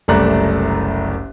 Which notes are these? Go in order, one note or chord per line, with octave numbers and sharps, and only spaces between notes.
F#1 C2 A3 D5 A#5 F#6